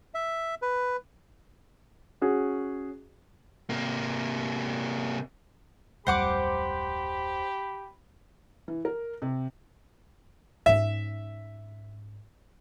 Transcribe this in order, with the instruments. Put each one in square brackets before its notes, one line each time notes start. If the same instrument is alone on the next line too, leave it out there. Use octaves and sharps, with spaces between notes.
[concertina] E5
B4
[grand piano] C#4 F#4 G#4
[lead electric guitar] C3 A#3
[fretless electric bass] D1 F2 G3 [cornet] G4 [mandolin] C5 F#5 D6 [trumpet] B5
[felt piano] E3
A#4
C3
[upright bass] G#2 C#4 [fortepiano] E5